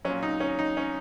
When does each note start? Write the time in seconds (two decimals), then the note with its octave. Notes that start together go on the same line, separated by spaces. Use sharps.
0.05 A#2 F#3 C#4
0.23 D#4
0.40 C#4
0.59 D#4
0.77 C#4